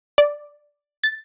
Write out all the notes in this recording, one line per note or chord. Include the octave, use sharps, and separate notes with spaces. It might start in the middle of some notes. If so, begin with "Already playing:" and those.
D5
A6